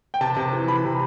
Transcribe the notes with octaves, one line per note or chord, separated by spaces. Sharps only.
G5
C3 A5
C3
E3
E3 B5
C3